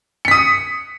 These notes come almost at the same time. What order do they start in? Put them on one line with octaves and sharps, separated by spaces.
C#7 B6 D#6